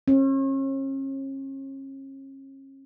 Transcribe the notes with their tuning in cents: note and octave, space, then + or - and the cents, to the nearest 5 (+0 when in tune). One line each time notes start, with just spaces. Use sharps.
C#4 -40